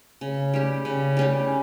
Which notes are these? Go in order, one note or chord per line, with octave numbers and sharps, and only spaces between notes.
C#3
G3 C#4 G4
C#3
G3 C#4 G4